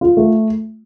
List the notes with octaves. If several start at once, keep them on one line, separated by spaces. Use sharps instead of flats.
F4
A3